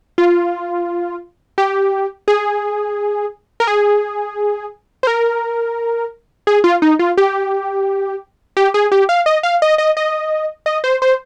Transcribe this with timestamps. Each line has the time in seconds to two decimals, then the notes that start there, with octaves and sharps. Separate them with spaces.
0.18 F4
1.58 G4
2.28 G#4
3.60 A#4
3.67 G#4
5.03 C5
5.07 A#4
6.47 G#4
6.64 F4
6.82 D#4
6.99 F4
7.18 G4
8.57 G4
8.74 G#4
8.92 G4
9.09 F5
9.26 D#5
9.43 F5
9.62 D#5
9.78 D#5
9.97 D#5
10.66 D#5
10.84 C5
11.02 C5